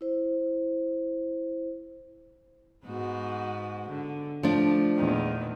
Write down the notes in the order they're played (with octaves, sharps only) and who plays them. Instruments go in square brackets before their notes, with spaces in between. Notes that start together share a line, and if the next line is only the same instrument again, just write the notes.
[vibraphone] E4 C5
[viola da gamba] G#2 B3 F#4
D3
[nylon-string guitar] F3 D4 [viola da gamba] A3
[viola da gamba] E2 A#2 D#3